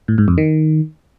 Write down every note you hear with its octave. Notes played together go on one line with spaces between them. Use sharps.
A2
G#2
F2
D#3